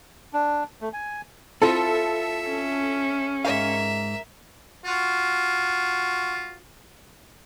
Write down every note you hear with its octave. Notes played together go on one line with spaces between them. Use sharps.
D4
A3
G#5
C4 E4 F4 A4 E5
C#4
G#2 A#4 E5 F5
F4 F#4